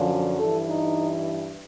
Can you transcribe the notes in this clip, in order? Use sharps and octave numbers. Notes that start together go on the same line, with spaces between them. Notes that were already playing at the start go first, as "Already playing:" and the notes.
Already playing: F#2 D3 F3
G2 E3 A4
D#4